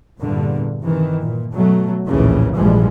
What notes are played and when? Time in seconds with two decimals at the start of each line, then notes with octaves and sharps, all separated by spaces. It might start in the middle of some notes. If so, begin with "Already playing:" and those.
0.20 E2 G2 A#2 D3
0.85 C3 D#3 E3
1.23 A#2
1.54 B2 F#3 A3
2.08 A#1 D#2 A2 C#3 E3
2.55 A#1 G#2 E3 F3 G3 G#3